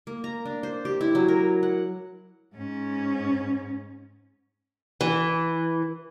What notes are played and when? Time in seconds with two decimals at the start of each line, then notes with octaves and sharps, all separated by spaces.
0.07 A#3
0.24 A#5
0.45 D4
0.63 C5
0.85 G4
1.01 E4
1.15 F#3
1.28 A#4
1.63 F#5
2.55 G#2 C#4
5.01 E3